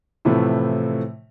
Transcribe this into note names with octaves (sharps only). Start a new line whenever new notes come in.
A2 C3 E3 F3 A3